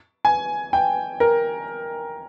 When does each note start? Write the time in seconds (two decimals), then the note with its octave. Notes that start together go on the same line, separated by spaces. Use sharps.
0.25 G#5
0.73 G5
1.20 A#4